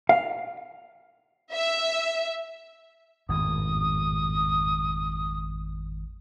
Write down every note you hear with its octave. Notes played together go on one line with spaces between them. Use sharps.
F5
E5
G#1 F2 A2 D#6